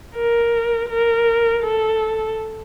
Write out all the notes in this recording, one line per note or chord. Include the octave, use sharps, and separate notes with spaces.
A#4
A#4
A4